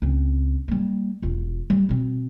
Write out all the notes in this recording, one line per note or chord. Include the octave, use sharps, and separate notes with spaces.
C#2 C4
G3 A#3
E1 F4
G3
B2 C4